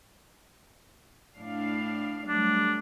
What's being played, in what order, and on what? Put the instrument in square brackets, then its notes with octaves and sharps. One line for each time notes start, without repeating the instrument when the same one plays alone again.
[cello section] A2 D4 F5
[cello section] F#3 G3 A3 [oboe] D4